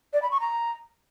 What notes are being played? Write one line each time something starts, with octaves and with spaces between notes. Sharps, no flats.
D5
B5
C#6
A#5